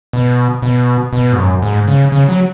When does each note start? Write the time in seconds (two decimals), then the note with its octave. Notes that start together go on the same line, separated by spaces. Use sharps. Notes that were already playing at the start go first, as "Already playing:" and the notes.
0.13 B2
0.62 B2
1.13 B2
1.33 G#2
1.38 F#2
1.62 G#2
1.88 C#3
2.12 C#3
2.29 F#3